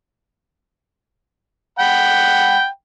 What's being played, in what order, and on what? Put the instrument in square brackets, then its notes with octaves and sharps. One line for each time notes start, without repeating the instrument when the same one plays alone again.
[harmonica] F#5 G5 B5